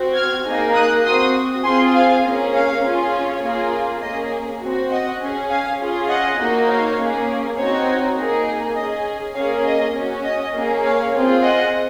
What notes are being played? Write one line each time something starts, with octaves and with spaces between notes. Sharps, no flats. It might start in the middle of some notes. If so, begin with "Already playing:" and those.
Already playing: C4 F#4
F6 G#6
A#3 D#4 G#4
D#6 F#6
C4 F#4 C6 D#6
C4 F4 G#4 G#5 C6
F5 G#5
A#3 C#4 G#4
C#5 F5
C#4 F4 G#4
C#5
A#3 F4 G#4
A#3 C#4 G#4 D#5
C4 F#4
D#5 F#5
C#4 G#4
F5 G#5
C#4 F4 G#4
D#5 F#5
A#3 D#4 F#4
C#5 F5
A#3 C#4 G#4
C4 D#4 F#4 C#5
A#3 D#4 G#4
C#4 G#4 D#5
A#3 C#4 G#4 C#5 F5
D#5
C#4 F#4
D#5
A#3 C#4 G#4
C#5 F5
C4 F4 G#4
D#5 F#5